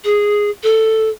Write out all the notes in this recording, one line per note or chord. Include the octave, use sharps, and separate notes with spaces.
G#4
A4